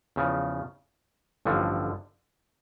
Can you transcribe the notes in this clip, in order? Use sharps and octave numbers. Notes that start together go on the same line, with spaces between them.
E2 C#3 F3
A1 G2 D3 F3